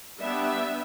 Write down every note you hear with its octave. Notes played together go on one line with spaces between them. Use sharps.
G3 B3 D4 E5